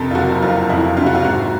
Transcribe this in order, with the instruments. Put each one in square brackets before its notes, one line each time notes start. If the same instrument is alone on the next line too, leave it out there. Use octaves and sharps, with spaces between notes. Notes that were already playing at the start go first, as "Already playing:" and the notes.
Already playing: [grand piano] F2 C3 [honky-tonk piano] A4 A#4
[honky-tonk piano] F4
[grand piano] F#1 [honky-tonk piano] F#4
[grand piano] F#1 [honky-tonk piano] F4
[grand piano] F2 [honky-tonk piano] E4
[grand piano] C3 [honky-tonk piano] F4
[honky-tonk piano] F#4
F4
[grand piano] G#2 [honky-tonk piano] F#4